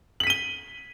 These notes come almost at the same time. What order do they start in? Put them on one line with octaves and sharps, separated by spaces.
F#7 B6 D#7 G7